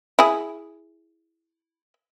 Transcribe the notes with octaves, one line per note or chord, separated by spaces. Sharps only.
E4 G#4